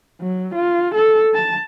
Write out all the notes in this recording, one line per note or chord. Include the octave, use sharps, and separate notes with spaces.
F#3
F4
A4
A5